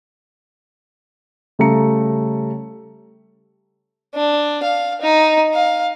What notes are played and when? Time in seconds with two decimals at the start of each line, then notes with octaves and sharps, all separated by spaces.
1.59 C#3 G3 A3 A#5 C#7
4.14 D4
4.63 F5
5.02 D#4
5.54 F5